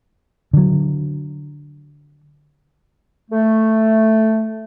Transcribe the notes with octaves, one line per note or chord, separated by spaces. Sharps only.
D3 F#3
A3